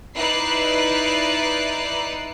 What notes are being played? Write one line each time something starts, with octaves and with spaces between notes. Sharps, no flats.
D#4 E4 B4 D5 F#6 C7